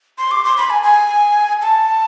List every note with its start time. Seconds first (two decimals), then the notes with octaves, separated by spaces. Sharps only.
0.18 C6
0.31 D6
0.45 C6
0.58 B5
0.70 G#5
0.83 G#5
1.61 A5